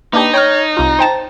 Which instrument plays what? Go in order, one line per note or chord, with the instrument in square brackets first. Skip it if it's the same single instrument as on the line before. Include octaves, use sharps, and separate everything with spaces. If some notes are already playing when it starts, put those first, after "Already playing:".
[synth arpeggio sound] A#3 D4 G4 [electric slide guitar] D#4 [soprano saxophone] B4
[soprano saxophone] C#5 [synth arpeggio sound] G5 A#5 F6
[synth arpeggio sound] C2 F4 [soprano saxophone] A#5
[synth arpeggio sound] C5 G5 A5